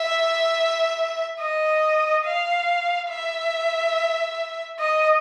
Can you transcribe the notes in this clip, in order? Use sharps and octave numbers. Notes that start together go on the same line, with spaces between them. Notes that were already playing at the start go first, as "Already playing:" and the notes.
Already playing: E5
D#5
F5
E5
D#5